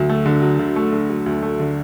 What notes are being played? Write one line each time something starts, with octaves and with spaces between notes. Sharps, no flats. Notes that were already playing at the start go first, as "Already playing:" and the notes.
Already playing: D2 F#3
A3
D3
F#3
D2
A3
D3
F#3
D2
A3
D3